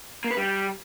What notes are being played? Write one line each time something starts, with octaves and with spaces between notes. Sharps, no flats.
A#3
B4
G3